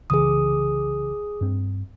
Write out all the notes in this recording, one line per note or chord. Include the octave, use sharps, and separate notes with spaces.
C2 C#3 E3 G#4 D#6
G2 C4